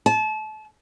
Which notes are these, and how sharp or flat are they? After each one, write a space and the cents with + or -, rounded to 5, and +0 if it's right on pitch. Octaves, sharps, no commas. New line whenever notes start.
A5 -30